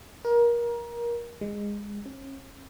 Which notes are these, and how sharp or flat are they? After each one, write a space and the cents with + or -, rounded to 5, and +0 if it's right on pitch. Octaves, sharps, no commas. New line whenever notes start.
A#4 +25
G#3 -20
C#4 -35